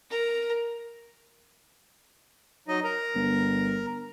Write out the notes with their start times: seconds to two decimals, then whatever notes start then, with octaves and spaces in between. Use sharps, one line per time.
0.10 A#4
2.68 F#3 D#4 D#5
2.84 A#4 A#5
3.15 G1